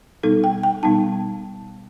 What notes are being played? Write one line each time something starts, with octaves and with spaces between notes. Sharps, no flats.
B2 G3 B3 D#4 A4
G5
G5
B2 G3 B3 D#4 A5